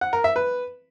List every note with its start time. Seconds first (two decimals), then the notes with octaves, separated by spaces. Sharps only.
0.01 F#5
0.13 A#4
0.24 E5
0.36 B4